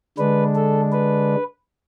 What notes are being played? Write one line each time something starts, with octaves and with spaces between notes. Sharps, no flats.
D3 G#3 D4 B4
A4
B4